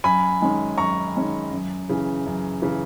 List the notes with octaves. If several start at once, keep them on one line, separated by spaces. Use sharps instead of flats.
F#2 G#5 B5
D#3 G#3 C#4
F#2 A#5 C#6
D#3 G#3 C#4
F#2
C#3 E3
F#2
C#3 E3